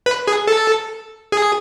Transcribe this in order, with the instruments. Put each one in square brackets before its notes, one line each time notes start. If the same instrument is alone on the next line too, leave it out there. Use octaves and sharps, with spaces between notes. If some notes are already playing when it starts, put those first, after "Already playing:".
[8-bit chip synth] B4
G#4
A4
G#4